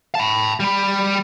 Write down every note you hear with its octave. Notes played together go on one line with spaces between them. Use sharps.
A5 B5
G3 B5